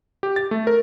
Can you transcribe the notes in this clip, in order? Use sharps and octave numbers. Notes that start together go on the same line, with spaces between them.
G4
A6
A3
A#4